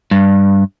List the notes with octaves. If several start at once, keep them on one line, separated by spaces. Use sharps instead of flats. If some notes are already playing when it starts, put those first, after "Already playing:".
G2